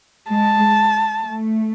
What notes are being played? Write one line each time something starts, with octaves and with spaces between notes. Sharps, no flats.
G#3 A5
A3